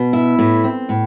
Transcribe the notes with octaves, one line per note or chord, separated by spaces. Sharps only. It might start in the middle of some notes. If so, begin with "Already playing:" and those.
Already playing: B2
E4
A2
C4
A2